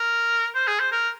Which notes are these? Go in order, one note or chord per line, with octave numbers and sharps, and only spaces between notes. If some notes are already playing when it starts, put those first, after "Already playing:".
Already playing: A#4
C5
G#4
C5
A#4